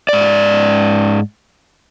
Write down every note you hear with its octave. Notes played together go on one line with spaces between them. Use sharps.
G#2 D5